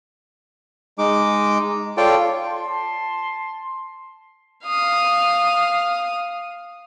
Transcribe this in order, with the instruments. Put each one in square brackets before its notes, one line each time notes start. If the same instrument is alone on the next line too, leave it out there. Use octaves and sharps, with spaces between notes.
[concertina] G#3 D#4 D6
F4 A4 C#5 D5 G5
[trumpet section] A5 C6
[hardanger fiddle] F5 D#6